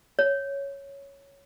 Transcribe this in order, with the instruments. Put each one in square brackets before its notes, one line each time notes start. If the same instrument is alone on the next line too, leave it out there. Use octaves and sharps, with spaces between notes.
[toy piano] C#5